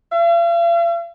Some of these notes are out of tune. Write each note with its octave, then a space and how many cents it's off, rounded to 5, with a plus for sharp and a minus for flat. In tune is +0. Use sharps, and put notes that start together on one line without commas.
F5 -45